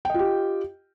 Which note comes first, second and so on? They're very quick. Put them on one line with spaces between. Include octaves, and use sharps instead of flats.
G5 D#5 F4 G4